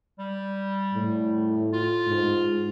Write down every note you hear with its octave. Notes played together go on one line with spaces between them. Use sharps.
G3
A2
F4
G#2